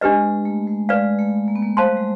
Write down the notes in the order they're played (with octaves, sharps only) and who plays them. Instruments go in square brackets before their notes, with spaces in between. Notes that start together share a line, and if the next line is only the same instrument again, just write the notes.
[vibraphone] G#3 [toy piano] D4 G4 B4 D#5
[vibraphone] G#3
A3
G#3
[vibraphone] G#3 [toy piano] B4 D5 F5
[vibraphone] A3
A#3
B3
A#3
[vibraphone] A3 [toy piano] C5 F5 A5 C6
[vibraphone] G3
G#3